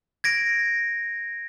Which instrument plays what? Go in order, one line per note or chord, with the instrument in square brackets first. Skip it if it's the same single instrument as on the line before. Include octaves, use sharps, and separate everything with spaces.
[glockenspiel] G#6 A#6 D7